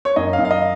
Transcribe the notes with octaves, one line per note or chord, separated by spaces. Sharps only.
C#5
F#2 D#5
F5
F#2
F5
D#5